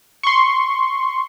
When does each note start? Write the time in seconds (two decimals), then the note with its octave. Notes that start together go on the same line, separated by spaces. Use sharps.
0.23 C6 C#6